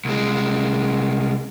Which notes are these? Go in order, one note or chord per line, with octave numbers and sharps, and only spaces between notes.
C2 G#3